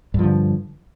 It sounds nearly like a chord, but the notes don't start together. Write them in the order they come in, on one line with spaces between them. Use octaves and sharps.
G2 F3 D3